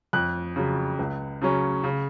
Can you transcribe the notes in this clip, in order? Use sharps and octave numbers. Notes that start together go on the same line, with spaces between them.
F2 F#6
C#3 F#3
C#2
C#3 F#3 C#4
C#3